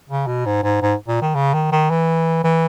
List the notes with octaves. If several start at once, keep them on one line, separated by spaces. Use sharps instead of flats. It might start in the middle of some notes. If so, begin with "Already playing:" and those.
C#3
B2
G#2
G#2
G#2
A#2
D#3
C#3
D#3
D#3
E3
E3